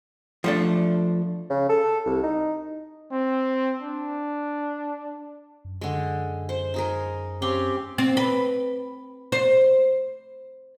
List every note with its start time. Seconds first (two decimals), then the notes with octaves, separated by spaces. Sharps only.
0.44 F3 A3 D4
1.50 C#3
1.69 A4
2.06 C2
2.23 D#4
3.12 C4
3.82 D4
5.65 F#2
5.81 D3 G#3
6.49 C5
6.74 D#4 G#4 A#4
7.42 C4 C#4 G4 F5 C6
7.98 C4
8.17 B4
9.32 C5